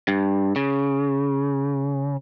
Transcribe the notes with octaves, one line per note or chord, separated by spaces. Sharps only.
G2
C#3